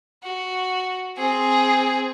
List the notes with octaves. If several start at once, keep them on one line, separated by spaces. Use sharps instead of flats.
F#4
C4 G#4